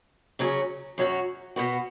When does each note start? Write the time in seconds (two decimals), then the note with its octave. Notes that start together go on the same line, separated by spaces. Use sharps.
0.39 C#3 F#3 C#4 G#4
0.98 F#2 F#3 C#4 F#4
1.56 B2 B3 F#4